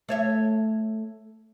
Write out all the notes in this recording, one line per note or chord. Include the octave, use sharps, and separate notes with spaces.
A3 C#5 E5